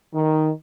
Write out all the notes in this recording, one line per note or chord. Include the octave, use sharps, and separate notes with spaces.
D#3